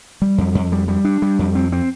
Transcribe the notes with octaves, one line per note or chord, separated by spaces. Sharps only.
G3
F2
F2
G3
G3
D4
G3
F2
C4
C4